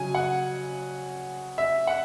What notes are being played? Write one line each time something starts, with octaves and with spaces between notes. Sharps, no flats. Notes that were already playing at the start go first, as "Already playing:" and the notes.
Already playing: C#3 F#3 G#5
F#5
E5
F#5